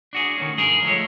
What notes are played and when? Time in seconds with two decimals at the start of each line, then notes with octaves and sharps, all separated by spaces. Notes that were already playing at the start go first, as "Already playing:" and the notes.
0.13 D4 F#4 G#4
0.38 D#3 A3 C#4
0.57 G2 G#4 A#4
0.83 F3 G#3 A3 C#5